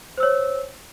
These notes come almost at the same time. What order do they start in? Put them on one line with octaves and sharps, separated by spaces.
C5 E6 C#5